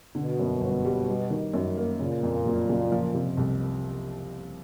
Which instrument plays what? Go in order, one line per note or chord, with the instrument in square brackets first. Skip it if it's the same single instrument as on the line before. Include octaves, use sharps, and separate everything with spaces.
[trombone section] B2 [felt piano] D3
[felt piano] F#2
G1
G3
G3
D#3
F#2
A#3
[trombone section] A#2 [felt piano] C#3
[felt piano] F2
F#1
F#1
F3
C3
C2